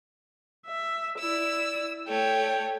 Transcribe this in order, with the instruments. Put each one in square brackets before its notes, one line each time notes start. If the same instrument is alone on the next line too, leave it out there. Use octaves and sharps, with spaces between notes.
[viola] E5
[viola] E4 D5 [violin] E6
[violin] A3 C#5 [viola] G5